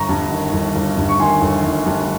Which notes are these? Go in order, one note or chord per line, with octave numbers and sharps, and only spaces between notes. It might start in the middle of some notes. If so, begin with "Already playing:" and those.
Already playing: G1 A#5 C#6
G2
D#3
G1
G1
G2
C#6
D#3 G#5 C6
G1
G1
G2